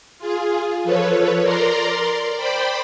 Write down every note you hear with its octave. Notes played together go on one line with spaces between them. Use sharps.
F4 G#4
F3 A4 B4 C#5
A#4 D5 A#5 C6
C5 D5 G5 B5